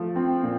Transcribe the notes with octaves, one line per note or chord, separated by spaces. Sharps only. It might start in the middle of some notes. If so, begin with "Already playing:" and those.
Already playing: F3 A3
C4
A#2